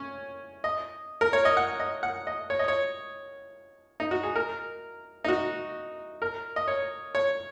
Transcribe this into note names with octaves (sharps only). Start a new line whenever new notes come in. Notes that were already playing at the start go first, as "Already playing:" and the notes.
Already playing: C#4
D#5
A#4
C#5
D#5
F#5
D#5
F#5
D#5
C#5
D#5
C#5
D#4
F#4
G#4
A#4
D#4
F#4
A#4
D#5
C#5
C#5